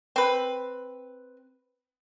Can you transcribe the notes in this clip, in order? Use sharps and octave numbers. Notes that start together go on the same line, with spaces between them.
C4 B4